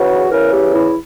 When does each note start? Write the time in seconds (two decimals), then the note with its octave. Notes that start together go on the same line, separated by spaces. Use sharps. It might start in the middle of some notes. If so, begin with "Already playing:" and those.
Already playing: E2 C#3 E3 F#4
0.31 E2 C#3 E3 A#4
0.52 G4
0.74 E4